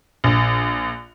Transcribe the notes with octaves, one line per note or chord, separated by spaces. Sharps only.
A#1